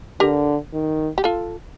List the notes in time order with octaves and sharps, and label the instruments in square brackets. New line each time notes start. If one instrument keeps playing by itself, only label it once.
[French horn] D3 [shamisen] G4 A#4
[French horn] D#3
[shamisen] G4
F4 A4